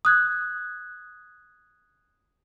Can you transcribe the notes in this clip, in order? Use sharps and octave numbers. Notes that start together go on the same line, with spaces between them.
D#6 F#6 G#6